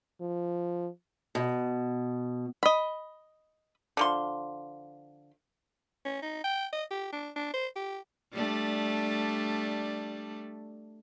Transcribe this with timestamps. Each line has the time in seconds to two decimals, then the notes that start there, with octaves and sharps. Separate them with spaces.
0.21 F3
1.35 B2
2.63 D#5 B5
3.97 D3 F3 C6
6.05 C#4
6.22 D#4
6.44 G5
6.73 D#5
6.91 G4
7.13 D4
7.36 D4
7.54 C5
7.76 G4
8.33 G3 A3 D4